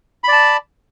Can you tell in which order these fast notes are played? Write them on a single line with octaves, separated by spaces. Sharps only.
B5 D5 A5